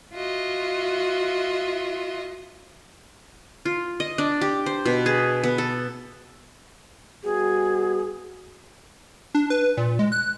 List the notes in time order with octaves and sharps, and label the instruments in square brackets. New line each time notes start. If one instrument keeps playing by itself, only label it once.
[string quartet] F4 F#4 D#5 E5
[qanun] F4
D#5
D4
G4
C5
B2
G#4
B3
A4
[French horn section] G3 B3 F#4 [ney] G#4
[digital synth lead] D4
B4
A#2
G#3
F#6